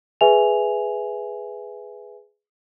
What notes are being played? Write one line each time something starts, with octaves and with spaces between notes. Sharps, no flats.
G#4 B4 E5 G#5 F7